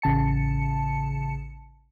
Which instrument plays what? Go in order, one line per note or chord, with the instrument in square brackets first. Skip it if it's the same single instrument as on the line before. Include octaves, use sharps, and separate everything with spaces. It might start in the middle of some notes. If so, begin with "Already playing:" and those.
[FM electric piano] A1 C#3 A5 C#7